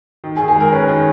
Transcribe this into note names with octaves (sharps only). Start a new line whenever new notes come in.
D#3
G#4
D#3
G#4
G#3 A#4
C#4 B4
D#3